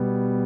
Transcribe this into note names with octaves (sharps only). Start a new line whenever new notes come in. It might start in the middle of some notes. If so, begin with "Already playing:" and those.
Already playing: B2 G3 B3